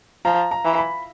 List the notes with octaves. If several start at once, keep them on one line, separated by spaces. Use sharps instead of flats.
F3 A#5
A#5
E3
B5